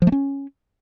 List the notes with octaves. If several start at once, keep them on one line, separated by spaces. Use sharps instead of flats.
F3
A3
C#4